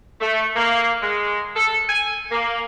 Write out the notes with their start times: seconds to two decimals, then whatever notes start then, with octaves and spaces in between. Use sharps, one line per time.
0.21 A3
0.56 A#3
1.02 G#3
1.56 A4
1.89 G#5
2.31 A#3